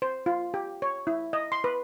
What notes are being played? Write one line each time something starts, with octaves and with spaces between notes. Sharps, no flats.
C5
F4
G4
C#5
E4
D#5
C6
B4